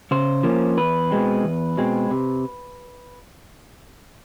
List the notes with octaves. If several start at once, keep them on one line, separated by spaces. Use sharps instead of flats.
C#3 C5
F3 A#3 C#4
E2 B4
B2 G#3 C4
E2
B2 G#3 C4
C3